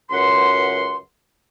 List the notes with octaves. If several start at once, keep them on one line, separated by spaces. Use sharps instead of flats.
C#2 F#2 B4 F#5 C6